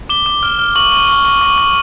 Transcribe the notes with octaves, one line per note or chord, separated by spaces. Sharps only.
D6 G7
D6
F6
F6
C#6 F#7
C#6
C#6
C#6
C#6
C#6